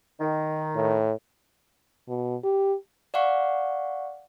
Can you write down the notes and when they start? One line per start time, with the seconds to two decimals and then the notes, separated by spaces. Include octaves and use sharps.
0.21 D#3
0.75 A2
2.08 B2
2.44 G4
3.14 D5 F5 F#5 C#6